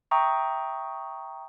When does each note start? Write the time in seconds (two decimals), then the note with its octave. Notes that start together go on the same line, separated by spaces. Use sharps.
0.11 E5 G5 A#5 C#6 D#6